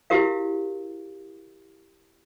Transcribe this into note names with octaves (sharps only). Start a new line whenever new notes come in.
E4 F#4 G4 A#4 F5